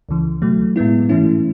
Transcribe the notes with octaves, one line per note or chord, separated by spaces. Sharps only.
C#2 C#3 E3
B2 F#3 A3
A2 G#3 B3 E4
G#2 E3 A3 C#4 E4